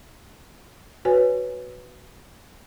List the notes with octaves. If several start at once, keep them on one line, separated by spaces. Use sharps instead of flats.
F#4 B4 C#5 G#5